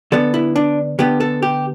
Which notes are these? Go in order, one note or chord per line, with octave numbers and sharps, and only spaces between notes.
D3 B3 A4
E4
D4
D3 B3 G4
A4
G4